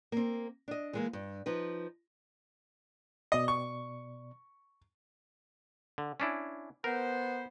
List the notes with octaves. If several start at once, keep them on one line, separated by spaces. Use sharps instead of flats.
A#3 C4
D4 D#5
E3 G#3 A#3
G2
F3 D#4 B4
B2 D5 D#5
C#6
D3
C#4 D4 E4
B3 A#4 C5